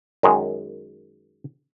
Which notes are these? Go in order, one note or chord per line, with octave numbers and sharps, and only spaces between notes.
F#2 D#3 G#3